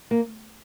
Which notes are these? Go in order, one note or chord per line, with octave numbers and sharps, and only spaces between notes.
A#3